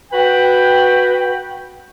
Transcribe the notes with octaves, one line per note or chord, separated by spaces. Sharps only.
F#4 B4 G5